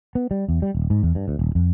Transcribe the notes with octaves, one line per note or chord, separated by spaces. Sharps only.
B3
G3
E2
G3
D#1
G#2
E2
G2
D2
D#1
F2